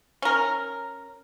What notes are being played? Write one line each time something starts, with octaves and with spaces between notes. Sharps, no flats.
C#4 A#4